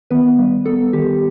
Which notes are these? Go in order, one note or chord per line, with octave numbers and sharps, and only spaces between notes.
D#3 B3 B4
G3
B3 A4
D#3 G4